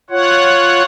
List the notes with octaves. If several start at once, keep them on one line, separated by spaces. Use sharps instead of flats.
F4 C#5 F#5